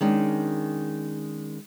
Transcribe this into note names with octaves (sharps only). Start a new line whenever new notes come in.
D#3 G#3 C#4 D4